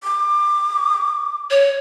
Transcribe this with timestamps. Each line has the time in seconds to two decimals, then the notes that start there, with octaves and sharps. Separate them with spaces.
0.04 D6
1.50 C#5